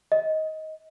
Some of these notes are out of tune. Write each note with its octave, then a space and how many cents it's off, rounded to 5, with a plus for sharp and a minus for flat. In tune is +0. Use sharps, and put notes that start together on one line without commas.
D#5 +15